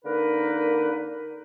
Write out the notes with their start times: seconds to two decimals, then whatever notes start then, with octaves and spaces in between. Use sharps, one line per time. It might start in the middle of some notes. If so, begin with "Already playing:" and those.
0.05 D3 A#3 D#4 A#4 B4